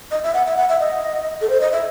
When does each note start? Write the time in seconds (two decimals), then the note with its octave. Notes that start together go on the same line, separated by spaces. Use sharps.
0.11 D#5
0.24 E5
0.34 F#5
0.47 E5
0.57 F#5
0.69 E5
0.80 D#5
1.41 A4
1.50 C5
1.61 D#5
1.72 E5